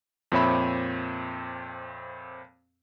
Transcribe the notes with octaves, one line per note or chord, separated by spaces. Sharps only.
F2 A#2 C4 C#5 E5 B5